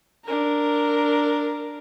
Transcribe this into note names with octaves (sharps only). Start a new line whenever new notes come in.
D4 A#4